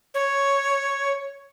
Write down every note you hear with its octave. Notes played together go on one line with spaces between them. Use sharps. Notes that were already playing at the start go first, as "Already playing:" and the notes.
C#5